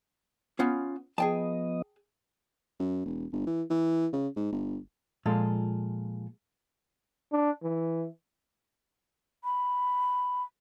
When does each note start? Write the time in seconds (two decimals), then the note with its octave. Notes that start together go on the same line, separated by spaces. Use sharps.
0.59 B3 C#4 F4
1.18 F3 B3 G#4 D#5 G5 A5
2.80 F#2
3.05 E1
3.32 G1
3.46 E3
3.70 E3
4.13 C#3
4.36 G#2
4.52 G1
5.26 A#2 F3 G#3 F4 A4
7.32 D4
7.63 E3
9.44 B5